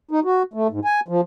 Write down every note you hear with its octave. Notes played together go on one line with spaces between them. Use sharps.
D#4
F#4
A3
G#2
G#5
F3